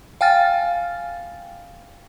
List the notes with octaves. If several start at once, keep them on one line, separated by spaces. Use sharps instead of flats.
F5 G5 G#5 F6 A6